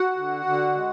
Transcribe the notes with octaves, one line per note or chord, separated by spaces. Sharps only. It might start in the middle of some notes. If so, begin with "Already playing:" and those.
Already playing: F#4 F#5
D3
D3
G#3